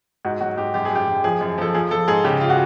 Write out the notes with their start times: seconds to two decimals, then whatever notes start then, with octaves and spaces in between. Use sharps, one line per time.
0.25 G#2 F#4
0.41 F#3 F#4
0.57 G#2 G4
0.74 F#2 G4
0.85 G#4
0.91 F#2 G4
1.07 F#2
1.24 F3 G#4
1.41 F#2
1.58 F3 A4
1.74 F3 G#4
1.91 F3 A4
2.08 G#2 G#4
2.24 C#3 G4
2.41 F4
2.49 F#4